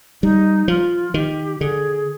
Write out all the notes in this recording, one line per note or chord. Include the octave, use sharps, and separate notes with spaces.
G3 D#4
F3 F4
D#3 G4
D3 G#4